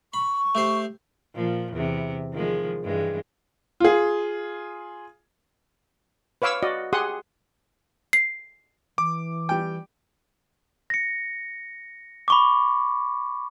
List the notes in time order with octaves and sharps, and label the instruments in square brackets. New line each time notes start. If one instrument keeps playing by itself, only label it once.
[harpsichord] B5 [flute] C#6
[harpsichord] A3 G4 C5
[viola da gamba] A#2 F3
E2 C3
D#3 F3 G#3
G2 E3 G#3
[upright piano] F4 G#4
[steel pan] B4 C#5 F5 D6 E6
F#4 D5 D#5
G4 G#4 F#5 C6 D#6
[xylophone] C7
[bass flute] E3 [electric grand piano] D6
[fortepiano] G3 G5
[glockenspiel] A#6 C#7
B5 C#6 D6